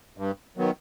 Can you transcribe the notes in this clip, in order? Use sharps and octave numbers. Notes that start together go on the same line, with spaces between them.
G2
D#3 F#3 B3